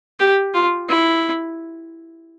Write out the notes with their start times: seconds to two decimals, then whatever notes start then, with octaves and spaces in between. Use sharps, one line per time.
0.20 G4
0.54 F4
0.89 E4